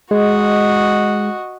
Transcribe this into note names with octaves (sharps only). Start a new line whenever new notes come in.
G#3 F#4 D#5